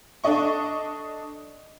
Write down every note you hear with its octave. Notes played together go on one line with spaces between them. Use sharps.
D4 A4 D5 D#5 C#6